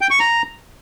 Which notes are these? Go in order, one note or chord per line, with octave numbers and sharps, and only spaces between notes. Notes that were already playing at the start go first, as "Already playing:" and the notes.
G5
C#6
A#5